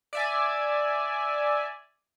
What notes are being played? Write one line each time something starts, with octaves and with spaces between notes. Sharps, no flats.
D5 E5 G#5